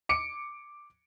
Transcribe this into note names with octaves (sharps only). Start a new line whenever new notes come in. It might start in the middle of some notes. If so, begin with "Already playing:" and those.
D6 C#7 D7